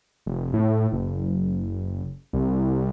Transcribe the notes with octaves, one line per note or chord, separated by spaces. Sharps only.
F1
A2
F#1
C2